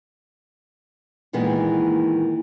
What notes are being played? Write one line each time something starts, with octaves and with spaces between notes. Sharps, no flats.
A#2 D#3 E3 G#3 B3